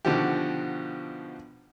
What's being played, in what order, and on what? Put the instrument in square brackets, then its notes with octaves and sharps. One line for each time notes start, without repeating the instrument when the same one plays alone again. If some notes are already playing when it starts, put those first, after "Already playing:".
[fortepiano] B2 D3 D#3 F3 F#4 G4